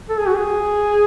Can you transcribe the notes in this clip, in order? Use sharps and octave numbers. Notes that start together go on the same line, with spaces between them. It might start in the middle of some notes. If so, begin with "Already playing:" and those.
A4
G#4
F#4
G#4